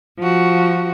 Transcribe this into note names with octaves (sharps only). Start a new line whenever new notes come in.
F3 F#4